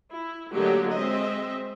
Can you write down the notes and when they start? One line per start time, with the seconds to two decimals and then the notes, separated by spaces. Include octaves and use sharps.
0.11 E4
0.52 D3 F#3 A3 A#3 G4 D#5
0.91 G#3 C4 D#5 E5